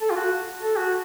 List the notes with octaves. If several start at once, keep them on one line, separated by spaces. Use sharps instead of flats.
A4
F4
F#4
A4
F#4